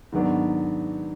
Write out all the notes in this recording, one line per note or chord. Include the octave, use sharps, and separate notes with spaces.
G#2 D#3 F#3 B3 D4